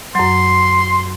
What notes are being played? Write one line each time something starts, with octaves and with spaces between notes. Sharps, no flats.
F#2 F#3 C6